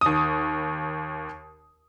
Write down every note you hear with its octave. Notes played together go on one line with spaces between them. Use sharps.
D#2 D#6